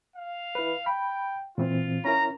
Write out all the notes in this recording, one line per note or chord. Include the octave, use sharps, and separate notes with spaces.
F5
E4 B4
G5 B5
A#2 E3 C4 F4
C#4 E4 A#4 A#5